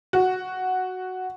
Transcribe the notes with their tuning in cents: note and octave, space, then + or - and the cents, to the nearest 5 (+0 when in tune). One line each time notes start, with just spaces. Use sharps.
F#4 +0